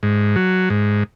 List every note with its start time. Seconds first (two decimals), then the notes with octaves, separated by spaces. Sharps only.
0.03 G#2
0.36 F#3
0.70 G#2